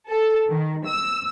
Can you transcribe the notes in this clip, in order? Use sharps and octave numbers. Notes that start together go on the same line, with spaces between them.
A4
D#3
E6